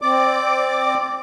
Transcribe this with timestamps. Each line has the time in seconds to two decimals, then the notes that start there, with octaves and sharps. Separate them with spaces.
0.02 C4 D5 D6